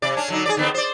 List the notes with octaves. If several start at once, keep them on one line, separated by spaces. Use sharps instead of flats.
C3 D5
C#4 D4
D3 F#3 D#4
G#4 B4 D5
D3 B3 C4
C5 D5